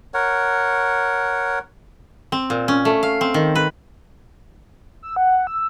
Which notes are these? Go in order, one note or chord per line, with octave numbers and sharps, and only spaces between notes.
A#4 C#5 F#5
C4
A#2
C#4
A3
F5
C4
D#3
B4
E6
F#5
E6